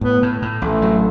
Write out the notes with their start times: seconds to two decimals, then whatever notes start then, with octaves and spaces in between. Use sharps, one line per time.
0.01 A2 B3
0.22 A2
0.42 A2
0.62 A1 A3
0.82 F#3